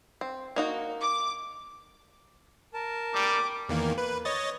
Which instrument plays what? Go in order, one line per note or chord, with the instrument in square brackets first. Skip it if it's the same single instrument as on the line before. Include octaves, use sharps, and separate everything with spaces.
[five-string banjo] C4
A#3 D#4 F#4
[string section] D6
[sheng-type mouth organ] A#4 A5
[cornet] G3 [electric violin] D6
[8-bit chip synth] E2 D#3 A#3
B4
C#5 D#5 A6